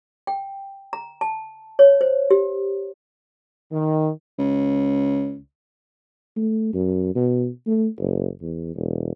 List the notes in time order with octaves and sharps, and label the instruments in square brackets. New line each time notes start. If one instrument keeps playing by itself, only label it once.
[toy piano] G5
A#5
A5
C#5
C5
G4
[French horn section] D#3
[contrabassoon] C#2
[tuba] A3
F#2
B2
A3
F#1
E2
E1